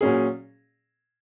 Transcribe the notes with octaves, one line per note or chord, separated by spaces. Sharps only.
A#2 F#3 C#4 G#4